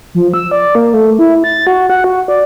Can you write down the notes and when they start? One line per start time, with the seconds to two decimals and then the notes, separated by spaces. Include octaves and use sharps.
0.15 F3
0.34 E6
0.51 D5
0.75 A#3
0.94 A3
1.19 E4
1.44 A6
1.67 F#4
1.90 F#5
2.04 F#4
2.28 D5